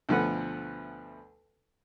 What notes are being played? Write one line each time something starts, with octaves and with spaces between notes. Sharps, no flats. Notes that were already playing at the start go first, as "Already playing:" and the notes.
D2 B2 F3 A3 B4 F#5